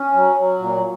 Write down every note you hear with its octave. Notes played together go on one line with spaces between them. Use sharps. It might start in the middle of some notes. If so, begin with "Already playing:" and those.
Already playing: C#4
F#3
F#3
A#2